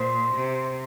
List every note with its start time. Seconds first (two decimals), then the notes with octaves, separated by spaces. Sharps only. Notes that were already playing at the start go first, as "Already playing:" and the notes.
Already playing: A#2 C5
0.35 C3